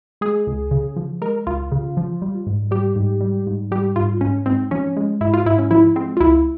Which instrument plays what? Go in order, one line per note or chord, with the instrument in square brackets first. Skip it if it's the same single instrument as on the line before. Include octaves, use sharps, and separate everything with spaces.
[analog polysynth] G#3 G#4
C#2
C#3
F3
G#3 A#4
C#2 F4
C#3
F3
G3
G#2
G3 G4
G#2
G3
G#2
G3 G4
G#2 F4
G#2 C#4
G#2 C4
F3 C#4
G#3
G#2 E4
F4
G#2 E4
C#4
F3 E4
G#3 C4
F4
C#2 E4